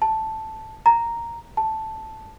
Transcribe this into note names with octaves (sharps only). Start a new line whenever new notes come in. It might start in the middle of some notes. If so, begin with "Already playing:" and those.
A5
A#5
A5